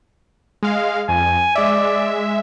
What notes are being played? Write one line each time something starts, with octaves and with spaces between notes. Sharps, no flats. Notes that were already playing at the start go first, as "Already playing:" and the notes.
G#3 F5
F2 G#5
G#3 D5 E5